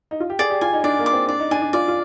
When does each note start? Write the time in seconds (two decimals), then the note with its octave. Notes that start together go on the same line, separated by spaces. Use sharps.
0.11 D#4
0.20 F4
0.30 G4
0.39 G#4 D5
0.50 G4
0.61 F4 G#5
0.73 D#4
0.84 D4 D5
0.99 A#3
1.06 D6
1.13 C4
1.28 D4 D5
1.39 D#4
1.51 D4 G#5
1.62 D4
1.73 F4 D5
1.88 F4